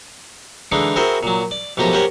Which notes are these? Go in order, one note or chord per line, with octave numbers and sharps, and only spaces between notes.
D3 E3 G#3 D4 D#4
C4 E4 F#4 G#4 A#4 C5
A#2 F#3
D5
B1 A2 F3 A#3 G4 A#5
G4 A#4 C5 C#5 F#5 G#5